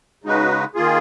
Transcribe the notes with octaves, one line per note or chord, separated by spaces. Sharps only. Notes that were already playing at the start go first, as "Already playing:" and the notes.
C#3 G#3 D#4 F#4 B4
D#3 A#3 F4 G#4